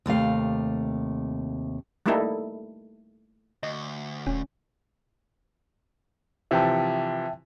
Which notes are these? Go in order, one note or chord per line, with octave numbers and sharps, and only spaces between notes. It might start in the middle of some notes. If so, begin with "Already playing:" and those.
D#2 C3 A3 F5
G3 A3 A#3 D#4 E4 A4
D2 D#5
D#1 C#4
C3 E3 F3 E5 G5 A5